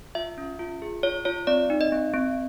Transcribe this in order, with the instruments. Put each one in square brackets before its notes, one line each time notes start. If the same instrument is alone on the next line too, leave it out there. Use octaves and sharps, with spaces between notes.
[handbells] F4 E5
C#4
F4
G#4
F4 C#5
F4 C#5
C4 D5
D#4
D#5
C4
C4